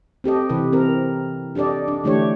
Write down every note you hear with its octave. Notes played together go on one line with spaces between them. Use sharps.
C4 G4 A4 D#5
C3 E3 B4
C4 A#4
D4 G4 A4 D5 D#5
D4
D3 E3 A3 D4 G4 C#5